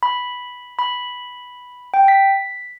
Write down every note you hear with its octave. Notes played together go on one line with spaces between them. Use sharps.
B5
B5
G5
B6